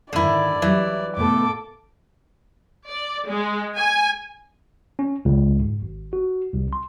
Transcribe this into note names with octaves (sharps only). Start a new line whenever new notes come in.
G#2 D3 D#3 D4 E4 D5
E3 F#3 G3
A2 C3 B3 A4 D6
D5
G#3
G#5
C#4
C#2
G#2
G#1
F#4
C2
C6